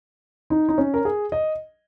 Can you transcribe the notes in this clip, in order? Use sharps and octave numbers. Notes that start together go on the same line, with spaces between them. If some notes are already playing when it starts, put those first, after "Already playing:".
D#4
D#4
C#4
A#4
G#4
D#5